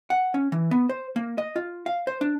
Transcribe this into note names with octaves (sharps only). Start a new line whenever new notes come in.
F#5
C#4
E3
B3
C5
A#3
D#5
F4
F5
C5
D4